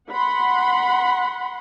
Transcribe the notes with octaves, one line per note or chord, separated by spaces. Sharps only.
F#5 B5 C6